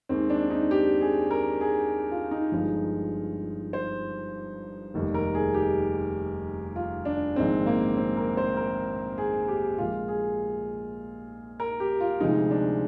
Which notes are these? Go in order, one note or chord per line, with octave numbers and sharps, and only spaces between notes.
D#2 D#3 G#3 C4
D4
D#4
G4
G#4
A#4
G#4
F4
D#4
G1 G2 F3 G#3
C5
F1 D#2 D#3 G3
A#4
G#4
G4
F4
D4
A#1 G#2 D#3 G#3 C4
A#3
C4
A#4
C5
A#4
G#4
G4
A#1 A#2 G#3 F4
G#4
A#4
G4
F4
D2 C3 F3 G#3 D#4
D4